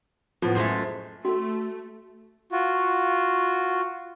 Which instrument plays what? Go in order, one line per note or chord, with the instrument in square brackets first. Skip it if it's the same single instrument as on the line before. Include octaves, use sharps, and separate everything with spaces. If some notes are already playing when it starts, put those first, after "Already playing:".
[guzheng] A2 [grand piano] F3 B3
[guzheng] F#2 G#3 A3 [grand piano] C5
[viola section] A3 [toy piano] F#4
[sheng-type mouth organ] F4 F#4